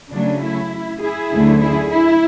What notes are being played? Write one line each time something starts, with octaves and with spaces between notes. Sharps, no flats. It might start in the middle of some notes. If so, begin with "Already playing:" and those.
C#3 F#3 A3 C#4 D4
E4
E4 G#4
D2 D3 F#3 A3 C#4
E4 G#4
E4